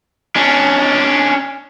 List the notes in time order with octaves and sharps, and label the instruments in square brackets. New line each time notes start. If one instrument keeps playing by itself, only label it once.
[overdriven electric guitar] C#4 D4